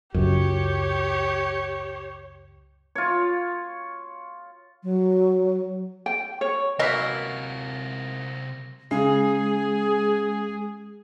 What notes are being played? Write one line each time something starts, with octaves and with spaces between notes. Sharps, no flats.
C#2 F#2 G4 C#5
F4 C#5
F#3
G5
C#5
C3 E3 F#3 A#3 A#4 D#5 A#6 B6
C#3 G#3 G#4